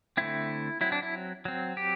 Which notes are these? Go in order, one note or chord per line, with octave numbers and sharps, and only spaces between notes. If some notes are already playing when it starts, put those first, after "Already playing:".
D3 A3 C4 E4
F#3 C4 E4
D4
E4
F#3 C4
G4